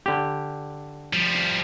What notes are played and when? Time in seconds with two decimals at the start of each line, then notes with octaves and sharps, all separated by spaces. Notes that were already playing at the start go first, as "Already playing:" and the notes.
0.06 D3 G4
1.13 F3 G3